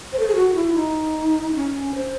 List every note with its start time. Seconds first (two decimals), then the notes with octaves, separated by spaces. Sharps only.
0.13 C5
0.19 A4
0.28 G#4
0.36 F#4
0.55 E4
0.75 D#4
1.55 C#4
1.95 C5